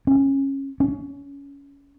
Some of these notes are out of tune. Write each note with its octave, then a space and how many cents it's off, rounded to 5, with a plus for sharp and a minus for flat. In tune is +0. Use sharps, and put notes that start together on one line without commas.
C#4 -20
C#4 +20